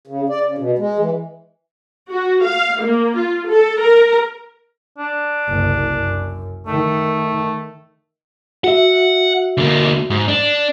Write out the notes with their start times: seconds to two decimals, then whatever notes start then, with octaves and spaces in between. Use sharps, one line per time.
0.07 C#3
0.29 D5
0.45 C#3
0.58 B2
0.79 G#3
0.99 E3
2.10 F#4
2.45 F5
2.82 A#3
3.17 F4
3.50 A4
3.82 A#4
4.98 D4
5.48 F#1 C2
5.89 F#2
6.67 D#3 A3
8.64 F#4 E5 F#5
9.58 D3 A#3
10.10 G#2
10.28 D4